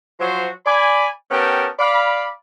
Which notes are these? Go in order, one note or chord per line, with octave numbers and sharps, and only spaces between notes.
F3 F#3 F#4 C5 C#5
D5 G#5 B5
B3 C#4 G4 A#4 G5 A5
D5 F5 B5